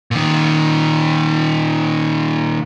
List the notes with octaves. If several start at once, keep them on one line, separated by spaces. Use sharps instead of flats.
A#2 D#3